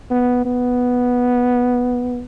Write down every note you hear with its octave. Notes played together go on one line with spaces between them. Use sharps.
B3
B3